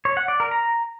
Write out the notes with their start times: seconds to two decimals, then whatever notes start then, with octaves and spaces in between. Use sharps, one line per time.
0.05 C#5
0.17 F#5
0.28 D5
0.40 A#4
0.51 A#5